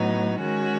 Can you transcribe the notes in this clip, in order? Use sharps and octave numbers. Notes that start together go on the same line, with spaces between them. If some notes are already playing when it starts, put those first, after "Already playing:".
Already playing: A2 F#3 B3 D#4
D#3 G#3 C#4 F#4